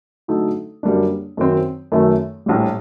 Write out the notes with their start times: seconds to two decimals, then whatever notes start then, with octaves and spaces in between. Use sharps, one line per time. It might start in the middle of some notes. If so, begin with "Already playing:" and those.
0.28 D3 F#3 A3 D#4 A4
0.83 F#2 D3 G3 A#3 D4
1.37 F#2 D#3 F#3 C4
1.92 F#2 D#3 A3
2.46 A#1 A2 G3